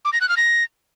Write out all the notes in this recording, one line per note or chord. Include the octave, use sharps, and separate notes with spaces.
D6
A#6
F#6
F6
A#6